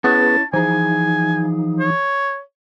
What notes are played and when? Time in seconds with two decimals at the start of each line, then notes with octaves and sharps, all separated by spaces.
0.04 B3 C#4 E4 G#4 B4 C#5 A5
0.53 E3 F3 D#4 G#4 G#5
1.79 C#5